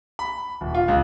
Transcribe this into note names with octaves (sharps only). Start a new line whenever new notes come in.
B5
D#1
F4
C#2